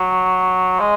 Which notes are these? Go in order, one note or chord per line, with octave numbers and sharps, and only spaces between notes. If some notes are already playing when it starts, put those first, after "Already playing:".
Already playing: F#3
G#3